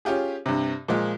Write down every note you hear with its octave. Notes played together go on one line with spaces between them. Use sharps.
C#4 F4 G4 G#4
G2 C3
A#2 F3 G#3 F4